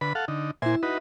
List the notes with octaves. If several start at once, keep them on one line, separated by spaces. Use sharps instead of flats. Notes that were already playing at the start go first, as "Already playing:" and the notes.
D3 B4 B5
A4 F5 F#5
D3 D#4
A#2 E4 C5 E5 G#5
D#4 F#4 B4